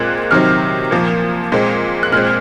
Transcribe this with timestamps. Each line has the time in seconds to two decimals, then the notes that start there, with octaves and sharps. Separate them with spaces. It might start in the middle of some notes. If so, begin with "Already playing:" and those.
Already playing: A#2 G#3 C4 F#6
0.31 C3 D#3 F#3 C4 F6
0.91 A#2 F3 A#3
1.52 A#2 G#3 C4
2.03 F#6
2.12 A#2 G#3 C4 F6